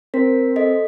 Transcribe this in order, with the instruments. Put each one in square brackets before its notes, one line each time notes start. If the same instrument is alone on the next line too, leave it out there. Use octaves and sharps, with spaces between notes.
[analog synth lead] C4 [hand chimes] A#4 B6
[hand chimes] A4 D#5 B6